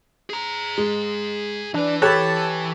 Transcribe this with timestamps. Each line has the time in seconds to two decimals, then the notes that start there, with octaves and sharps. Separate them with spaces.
0.30 G#4 A#5
0.78 G#3
1.74 E3 D4 B4
2.02 G4 A4 C#5 A5 B5 F#6